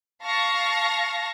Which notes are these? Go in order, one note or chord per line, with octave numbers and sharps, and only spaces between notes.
F5 A5 C#6 A#6